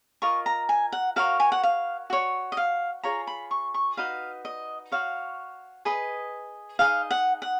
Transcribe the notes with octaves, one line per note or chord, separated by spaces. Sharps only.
F4 A#4 D#5 C#6
A#5
G#5
F#5
F#4 A#4 C#5 F5
G#5
F#5
F5
F#4 C#5
D#5
F5
F4 G#4 C#5 A#5
B5
C#6
C#6
D#4 F#4 B4 D#5 F5
D#5
F#4 C#5 F5
G#4 B4 D#5
D#4 G#4 D#5 F5
F#5
F#5